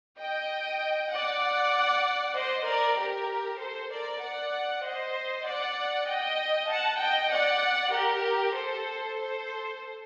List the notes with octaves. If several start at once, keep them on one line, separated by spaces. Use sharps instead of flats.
D#5 G5
D5 F#5
C5 D#5
A#4 D5
G4 A#4
A4 C5
A#4 D5
D5 F#5
C5 D#5
D5 F#5
D#5 G5
F#5 A5
D#5 G5
D5 F#5
G4 A#4
A4 C5
A4 C5